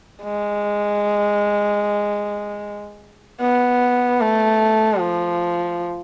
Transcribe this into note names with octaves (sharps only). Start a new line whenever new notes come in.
G#3
B3
A3
F3